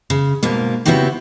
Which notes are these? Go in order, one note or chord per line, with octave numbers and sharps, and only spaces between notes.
C#3
G#2 B2 A#3
C#3 B3 C4 E4 F#4 G4